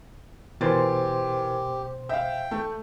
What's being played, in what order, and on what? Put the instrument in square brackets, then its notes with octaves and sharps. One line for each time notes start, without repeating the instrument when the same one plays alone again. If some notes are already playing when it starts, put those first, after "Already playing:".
[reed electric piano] B2 C5 C6 [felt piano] E3 A#4 A6 [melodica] G4
[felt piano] E5 F5 [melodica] G5
[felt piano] A3